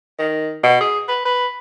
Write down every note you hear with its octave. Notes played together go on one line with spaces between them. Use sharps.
D#3
B2
G#4
B4
B4